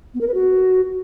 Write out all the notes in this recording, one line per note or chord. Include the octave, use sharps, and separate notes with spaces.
B3
A#4
B4
F#4